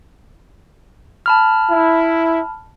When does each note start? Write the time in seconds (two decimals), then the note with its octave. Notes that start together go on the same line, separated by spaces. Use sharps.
1.26 A5 B5 F6
1.70 E4